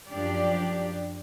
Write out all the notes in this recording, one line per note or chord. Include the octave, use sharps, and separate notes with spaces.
F#2 F3 D4 G4 D5